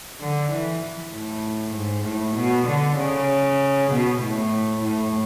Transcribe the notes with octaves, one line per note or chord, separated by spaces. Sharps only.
D3
E3
A2
G#2
A2
B2
D3
C#3
B2
A2
A2